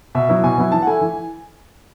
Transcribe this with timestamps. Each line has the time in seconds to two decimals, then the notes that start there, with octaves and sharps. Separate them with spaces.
0.15 B2 E5
0.29 F#3 B3 E4
0.43 B2 G#5
0.58 F#3 B3 E4
0.72 E3 A5
0.82 F#5
0.87 A3 E4 G#5
1.01 E3